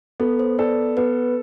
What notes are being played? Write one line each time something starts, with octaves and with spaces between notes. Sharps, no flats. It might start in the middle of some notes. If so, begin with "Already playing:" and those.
B3 A4
C5
A4 D5
B3 B4